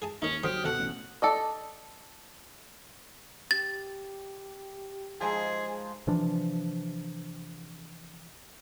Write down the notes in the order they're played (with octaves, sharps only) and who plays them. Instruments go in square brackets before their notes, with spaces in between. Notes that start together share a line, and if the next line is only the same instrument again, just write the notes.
[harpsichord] G#4 G#5 A5
[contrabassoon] D#2 [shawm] C#4 [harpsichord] D#4 A#4
[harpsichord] D3 C5 C6 [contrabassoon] F#3 [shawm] G4 [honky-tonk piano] D#6 F6
[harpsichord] D2 A4 [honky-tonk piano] B2 [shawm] F#5
[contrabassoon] A1
[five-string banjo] A4 D5 D#5
[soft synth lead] G4 [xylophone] A6
[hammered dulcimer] F3 G#3 D#4 [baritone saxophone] G#4 [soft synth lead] C6
[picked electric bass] C3 E3 F3 D4